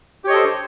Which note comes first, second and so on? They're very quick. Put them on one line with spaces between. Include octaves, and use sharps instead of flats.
G4 C#5 D#5 A4 C5